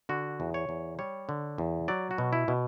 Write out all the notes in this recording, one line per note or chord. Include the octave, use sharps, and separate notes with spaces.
D3 F#4
E2
C#5
E2
G3 C#5
D3
E2
F#3 D5
F#4
B2
E4
B2